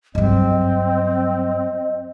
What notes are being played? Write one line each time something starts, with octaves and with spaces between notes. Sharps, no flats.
G2 F#3 C4 D#5